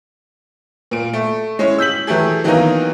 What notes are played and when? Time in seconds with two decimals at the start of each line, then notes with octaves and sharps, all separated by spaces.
0.91 A#2 D7
1.13 A3
1.59 G#3 C#4 E4 C#5
1.78 E6 G6 B6 F#7
2.07 E3 F#3 A3 G4 G#4
2.44 D#3 E3 F#3 A#3 B3 D#4